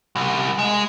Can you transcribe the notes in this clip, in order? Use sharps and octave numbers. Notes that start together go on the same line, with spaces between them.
C2
G#3